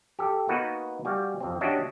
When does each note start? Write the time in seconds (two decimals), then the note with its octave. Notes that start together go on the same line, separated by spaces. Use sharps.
0.19 G4 A4
0.48 A#3 B3 D#4 F#4 A#4 B4
1.05 G3 F#4 F5 G#5
1.40 F2 C4
1.61 C#4 D4 F#4 G4 D#5 E5